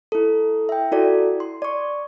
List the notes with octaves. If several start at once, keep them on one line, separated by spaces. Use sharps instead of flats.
E4 A4
E5 G5
E4 F#4 A4 D5
C6
D5 C#6